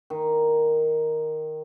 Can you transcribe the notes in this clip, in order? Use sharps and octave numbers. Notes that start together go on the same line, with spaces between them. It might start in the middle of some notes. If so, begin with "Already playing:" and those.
D#3